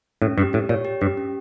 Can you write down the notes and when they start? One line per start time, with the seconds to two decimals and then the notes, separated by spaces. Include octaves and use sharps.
0.22 A2 C#4
0.38 G2 G4
0.53 A2 G4
0.69 A#2 C#5
0.85 G4
1.01 G2 G4
1.17 C#4